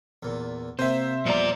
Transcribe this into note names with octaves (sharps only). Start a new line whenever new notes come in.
E2 A#2
C3 A#3 C4 C5 E5
E2 A#2 F3 G3 D5 A#5